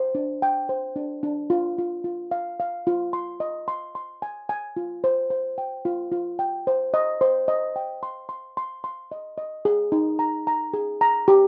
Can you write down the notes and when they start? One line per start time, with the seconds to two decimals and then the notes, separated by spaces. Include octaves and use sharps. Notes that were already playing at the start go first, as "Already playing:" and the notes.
Already playing: C5
0.15 D4
0.42 G5
0.69 C5
0.96 D4
1.23 D4
1.50 F4
1.78 F4
2.04 F4
2.31 F5
2.60 F5
2.87 F4
3.13 C6
3.40 D#5
3.68 C6
3.95 C6
4.22 G#5
4.49 G#5
4.77 F4
5.04 C5
5.30 C5
5.58 G5
5.85 F4
6.12 F4
6.39 G5
6.67 C5
6.94 D#5
7.21 C5
7.48 D#5
7.76 G5
8.03 C6
8.29 C6
8.57 C6
8.84 C6
9.12 D#5
9.38 D#5
9.65 G#4
9.92 D#4
10.19 A#5
10.47 A#5
10.74 G#4
11.01 A#5
11.28 G4